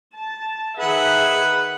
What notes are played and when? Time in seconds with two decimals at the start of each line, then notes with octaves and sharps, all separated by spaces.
0.15 A5
0.78 D#3 G#4 B4 E5 F#5